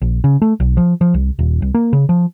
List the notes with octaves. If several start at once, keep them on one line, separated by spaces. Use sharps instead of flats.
A#1
C#3
A3
B1
F3
F3
C2
D#1
C2
A#3
C#3
F3